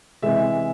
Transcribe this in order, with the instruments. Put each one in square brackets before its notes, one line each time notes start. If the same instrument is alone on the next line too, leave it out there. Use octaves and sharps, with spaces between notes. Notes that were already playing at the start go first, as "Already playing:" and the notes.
[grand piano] C3 E3 G#3 E5